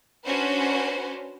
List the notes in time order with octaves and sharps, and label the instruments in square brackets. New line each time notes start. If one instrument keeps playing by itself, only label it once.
[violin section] C#4 D4 F#4 B4 C5